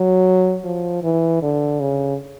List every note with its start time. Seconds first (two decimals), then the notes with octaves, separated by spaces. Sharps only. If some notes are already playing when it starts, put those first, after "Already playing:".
Already playing: F#3
0.65 F3
1.03 E3
1.42 D3
1.80 C#3